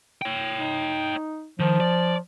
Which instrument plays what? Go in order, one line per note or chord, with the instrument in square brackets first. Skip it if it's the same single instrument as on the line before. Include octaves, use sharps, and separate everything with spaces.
[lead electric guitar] C#5 G5
[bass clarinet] D#4
[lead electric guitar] D#3 [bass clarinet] F3
[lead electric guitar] D5